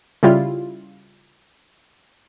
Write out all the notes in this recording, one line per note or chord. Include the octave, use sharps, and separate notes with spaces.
C#3 G3 E4 F4